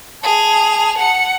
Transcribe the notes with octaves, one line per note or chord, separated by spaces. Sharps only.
G#4 A5 F7
F#5 C#7